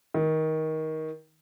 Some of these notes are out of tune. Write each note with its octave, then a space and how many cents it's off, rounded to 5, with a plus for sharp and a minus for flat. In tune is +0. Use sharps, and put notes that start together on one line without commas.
D#3 +20